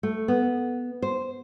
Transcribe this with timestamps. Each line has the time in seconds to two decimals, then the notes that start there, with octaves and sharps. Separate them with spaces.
0.03 A3
0.28 B3
1.02 C5